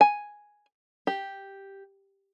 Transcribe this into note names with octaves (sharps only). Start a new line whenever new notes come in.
G#5
G4